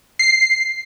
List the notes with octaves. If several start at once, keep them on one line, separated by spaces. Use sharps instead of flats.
C7